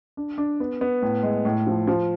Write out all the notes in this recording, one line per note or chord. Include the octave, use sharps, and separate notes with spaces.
D4
D4
B3
B3
A2
G#3
A2
F3
F3